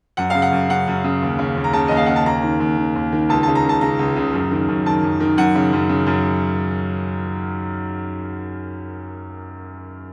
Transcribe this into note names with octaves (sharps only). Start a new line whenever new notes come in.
F#2 F#5
C#3 F5
F#5
F#2
C#3 F#5
F#2
C#3
D#2
C#3
D#2
A#5
C#3 A5
D#2 D#5
F5
C#3 F#5
A5
D#2 A#5
D#3
D#2
D#3
D#2
D#3
C#2 A5
C#3 A5
A#5
C#2 A5
C#3 A#5
C#2
C#3
F#2
D#3
F#2
D#3 A5
F#2
D#3
F#2 F#5
C#3
F#2
C#3
F#2